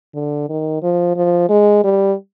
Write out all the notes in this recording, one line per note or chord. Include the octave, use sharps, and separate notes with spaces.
D3
D#3
F3
F3
G#3
G3